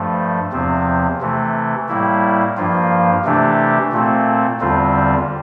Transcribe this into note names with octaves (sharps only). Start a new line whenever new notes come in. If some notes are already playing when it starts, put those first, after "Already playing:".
Already playing: G2 F3 A3
E2 C3 F3 C4
C3 E3 A3
A2 G3 A#3 E4
G2 F3 A#3 F4
C3 E3 A3 D4 G4
A#2 A3 C4
E2 D3 G3 C4 F4